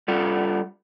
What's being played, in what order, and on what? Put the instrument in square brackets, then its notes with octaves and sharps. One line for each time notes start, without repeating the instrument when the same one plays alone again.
[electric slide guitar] G3 F4 A4